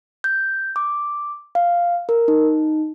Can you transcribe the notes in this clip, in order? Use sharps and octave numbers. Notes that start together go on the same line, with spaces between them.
G6
D6
F5
A#4
D#4